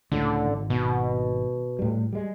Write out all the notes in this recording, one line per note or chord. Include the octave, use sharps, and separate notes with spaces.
C#2 A2 D3
G#1
B2
A2 G3
G3 G#3